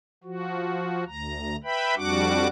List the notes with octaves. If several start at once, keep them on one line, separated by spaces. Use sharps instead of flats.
F3 F#4
D2 A#5
B4 E5 G5 B5
F2 G3 D4 F#4 F#5 D6